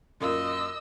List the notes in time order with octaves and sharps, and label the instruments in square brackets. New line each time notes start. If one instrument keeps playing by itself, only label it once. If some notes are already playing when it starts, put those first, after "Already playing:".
[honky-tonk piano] F#2 A#2 F4 [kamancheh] D#5 E6